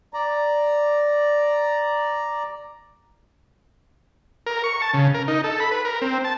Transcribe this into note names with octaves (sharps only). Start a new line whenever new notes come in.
D5 A#5
A#4
C#6
A5
C#3
A#4
D#4
A4
B5
B4
A#4
C4
A5